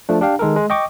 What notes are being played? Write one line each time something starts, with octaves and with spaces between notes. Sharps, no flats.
F3 A3 D4
D4 G4 F5 G5
D#3 G#3 A4 A#4
G#3
D#5 G5 C#6 D6